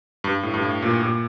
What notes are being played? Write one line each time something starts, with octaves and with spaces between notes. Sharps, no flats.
G2
A2
G2
A2
A#2
A#2